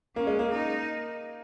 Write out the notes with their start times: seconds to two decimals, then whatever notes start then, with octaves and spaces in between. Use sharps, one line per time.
0.16 A#3 C#4
0.27 G#3
0.39 A#3
0.51 D#4